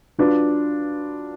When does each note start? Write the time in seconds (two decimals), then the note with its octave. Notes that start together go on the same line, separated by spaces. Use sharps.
0.18 F#3 D4 F4 B4